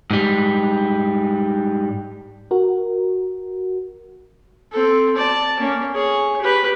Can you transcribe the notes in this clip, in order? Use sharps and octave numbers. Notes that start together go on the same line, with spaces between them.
G#2 G3
F#4 A#4
C4 A4
D5 A5
A#3 C#4
G#4 C#5
G4 B4